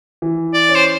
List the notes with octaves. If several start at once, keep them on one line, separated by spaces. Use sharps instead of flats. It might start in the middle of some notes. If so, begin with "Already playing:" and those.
E3
D5
C#4
C5